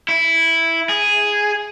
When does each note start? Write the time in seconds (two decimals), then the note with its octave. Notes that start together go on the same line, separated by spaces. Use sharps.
0.09 E4
0.89 G#4